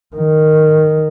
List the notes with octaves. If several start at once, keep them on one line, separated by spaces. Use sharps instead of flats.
D#3